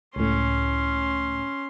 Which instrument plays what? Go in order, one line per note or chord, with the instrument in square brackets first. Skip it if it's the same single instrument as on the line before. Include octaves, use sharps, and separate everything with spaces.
[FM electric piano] C#2 A2 [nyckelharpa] C#4 C6